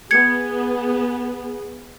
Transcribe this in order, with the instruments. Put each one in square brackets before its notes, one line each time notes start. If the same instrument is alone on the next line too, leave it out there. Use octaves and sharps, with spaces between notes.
[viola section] B3 G#4 [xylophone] G#6 C#7